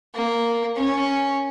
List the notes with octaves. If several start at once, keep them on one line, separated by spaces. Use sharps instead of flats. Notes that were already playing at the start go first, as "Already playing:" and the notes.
A#3
C#4